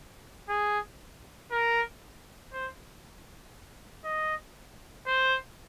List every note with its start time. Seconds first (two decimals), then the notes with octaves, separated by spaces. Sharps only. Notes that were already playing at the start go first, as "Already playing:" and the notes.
0.49 G#4
1.51 A#4
2.52 C5
4.04 D#5
5.07 C5